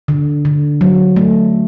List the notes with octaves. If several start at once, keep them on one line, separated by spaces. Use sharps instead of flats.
D3
D3
F#3
A3